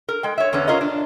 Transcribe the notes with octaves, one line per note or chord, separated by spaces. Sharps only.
A#4
G#3 G5
C#5 E5
E2 D3 B3 C#4
C#4 F4 A#4 D#5
D4